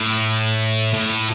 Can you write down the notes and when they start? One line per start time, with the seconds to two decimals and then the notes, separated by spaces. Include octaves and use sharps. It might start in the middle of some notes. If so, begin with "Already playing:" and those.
Already playing: A2
0.93 A2